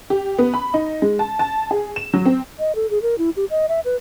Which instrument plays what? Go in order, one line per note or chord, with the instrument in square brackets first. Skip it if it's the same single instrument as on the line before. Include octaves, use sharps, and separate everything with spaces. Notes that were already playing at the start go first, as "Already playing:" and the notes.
[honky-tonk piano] G4
B3
B5
D#4
G#3
A5
A5
G#4
E7
F#3
C4
[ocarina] D#5
A4
G#4
A#4
E4
G4
D#5
E5
B4